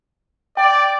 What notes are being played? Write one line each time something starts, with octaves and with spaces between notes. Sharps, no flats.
D5 G5